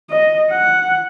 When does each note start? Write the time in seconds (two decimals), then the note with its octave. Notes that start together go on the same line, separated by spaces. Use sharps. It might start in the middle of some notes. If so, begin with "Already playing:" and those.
0.10 D#5
0.50 F#5